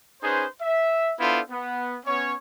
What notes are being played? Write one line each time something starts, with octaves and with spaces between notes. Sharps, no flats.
C#4 D#4 G#4 B4 C5
E5
B3 D4 E4 F4 A4 C5
B3
B3 C#4 C#5